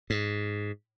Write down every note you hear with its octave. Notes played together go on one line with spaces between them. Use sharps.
G#2